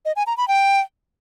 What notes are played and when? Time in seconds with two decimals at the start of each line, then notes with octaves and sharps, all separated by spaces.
0.05 D#5
0.16 G#5
0.27 A#5
0.37 B5
0.48 G5